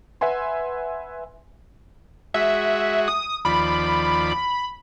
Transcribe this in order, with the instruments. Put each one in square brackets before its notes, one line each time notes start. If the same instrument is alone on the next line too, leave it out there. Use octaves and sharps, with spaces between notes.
[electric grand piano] B4 E5 F#5 G#5 C6
[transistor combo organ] G#3 F#4 [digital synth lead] E5
[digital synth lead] D#6
[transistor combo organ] D#2 F3 D5 [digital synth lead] B5